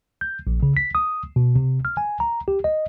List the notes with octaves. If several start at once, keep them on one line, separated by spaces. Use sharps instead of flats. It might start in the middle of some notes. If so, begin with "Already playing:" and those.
G6
A#1
C#3
B6
D#6
B2
C3
F6
G#5
A#5
G4
D#5